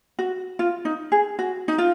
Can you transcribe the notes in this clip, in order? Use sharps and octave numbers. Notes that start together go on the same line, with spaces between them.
F#4
F4
D#4
G#4
F#4
D#4
F4